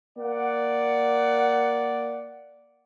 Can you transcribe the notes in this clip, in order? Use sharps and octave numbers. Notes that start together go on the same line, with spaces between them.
A#3 D5 F#5